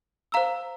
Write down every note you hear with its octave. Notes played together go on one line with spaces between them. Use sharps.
C5 F5 A#5 E6